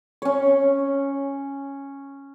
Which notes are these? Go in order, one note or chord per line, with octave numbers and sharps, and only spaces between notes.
C#4 C#5